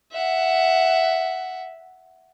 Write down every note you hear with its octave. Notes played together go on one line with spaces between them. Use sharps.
E5 F#5